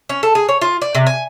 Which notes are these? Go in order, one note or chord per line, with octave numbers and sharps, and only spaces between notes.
C#4
A4
G#4
C#5
F4
D5
C3
G#5